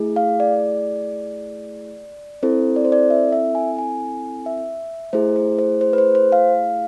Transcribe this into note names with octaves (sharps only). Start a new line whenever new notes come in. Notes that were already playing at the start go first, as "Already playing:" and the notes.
Already playing: A3 E4 G#4
F5
D5
C4 E4 A4 C5
D5
C5
D5
E5
E5
G#5
G#5
E5
A3 E4 G#4 C5
C5
C5
C5
B4
C5
C5
F5